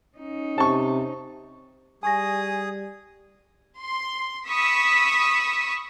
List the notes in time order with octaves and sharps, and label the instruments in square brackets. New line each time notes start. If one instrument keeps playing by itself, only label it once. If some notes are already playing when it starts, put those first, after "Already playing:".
[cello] C#4 D#4
[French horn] C3 [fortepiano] A5 C#6
[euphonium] G3 [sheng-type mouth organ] G#4 D#6 [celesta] G#5 C#6 A#6
[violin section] C6
B5 C#6 D#6 E6 B6